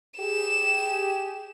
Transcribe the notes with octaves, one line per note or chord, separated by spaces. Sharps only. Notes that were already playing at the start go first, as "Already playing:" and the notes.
G4 G#4 E7